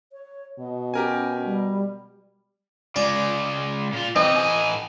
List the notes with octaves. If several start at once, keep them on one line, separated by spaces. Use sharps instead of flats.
C#5
B2 D#5
C#4 G4 A#4 G#5
G3
C#3 G#3 D5
A#2 F4
C3 E3 C4 D#5
A2 G#5